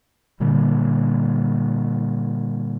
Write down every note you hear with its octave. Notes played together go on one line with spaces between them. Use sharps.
A#2 D3 G3 A#3